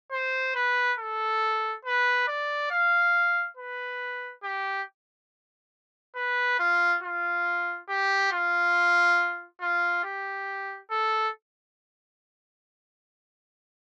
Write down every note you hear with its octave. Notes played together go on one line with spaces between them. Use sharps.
C5
B4
A4
B4
D5
F5
B4
G4
B4
F4
F4
G4
F4
F4
G4
A4